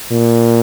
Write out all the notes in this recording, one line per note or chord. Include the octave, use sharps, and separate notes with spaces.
A#2